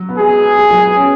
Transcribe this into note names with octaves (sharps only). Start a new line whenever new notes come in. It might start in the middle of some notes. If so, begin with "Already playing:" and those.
Already playing: F#3
B3
G#3 G#4
G#3
F#3
B3
C#4